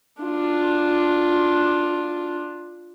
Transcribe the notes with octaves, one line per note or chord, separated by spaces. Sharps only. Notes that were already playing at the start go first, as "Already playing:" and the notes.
D4 F4